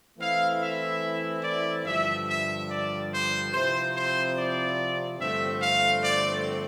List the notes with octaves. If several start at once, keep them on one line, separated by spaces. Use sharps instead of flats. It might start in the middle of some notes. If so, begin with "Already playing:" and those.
E3 A3 C4 E4 F5
E5
D5
G2 D3 F3 E5
E5
D5
C5
C3 F3 C4 E4 C5
C5
D5
G2 D3 F3 A3 C4 E5
F5
D5